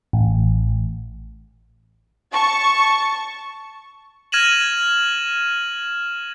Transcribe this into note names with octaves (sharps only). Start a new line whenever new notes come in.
A1
A5 C#6
F6 G#6 A#6 D#7 E7 F#7